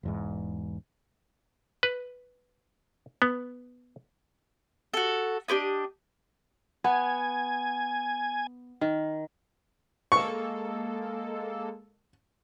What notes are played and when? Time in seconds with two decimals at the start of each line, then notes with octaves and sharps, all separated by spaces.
0.03 E1 E2 G#2
1.83 B4
3.22 B3
4.94 F#4 A4
5.48 D4 G4 B4 D#5
6.84 B3 G#5
8.81 D#3
10.12 G#3 A#3 A4 C#6